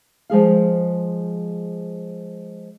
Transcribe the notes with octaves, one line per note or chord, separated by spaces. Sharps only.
F3 G#3 G#4 F5